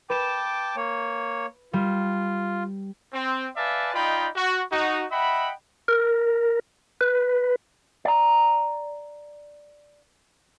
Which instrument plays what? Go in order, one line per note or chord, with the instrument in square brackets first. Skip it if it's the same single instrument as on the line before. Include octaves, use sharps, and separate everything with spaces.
[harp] B4 E7 [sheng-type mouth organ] G5 A5 D6
[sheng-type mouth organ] A#3 C#5
[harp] G3 [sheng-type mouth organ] F4
[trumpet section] C4
B4 D5 E5 F5 G#5 A5
D#4 F4 D5 D#5 G5 B5
F#4
D#4 F#4
D#5 E5 F#5 G5 B5
[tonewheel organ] A#4
B4
[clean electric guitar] D5 A#5